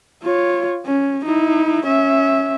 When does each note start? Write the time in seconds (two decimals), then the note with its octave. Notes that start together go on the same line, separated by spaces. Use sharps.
0.23 F4 C#5
0.86 C#4
1.25 D#4 E4
1.86 C#4 E5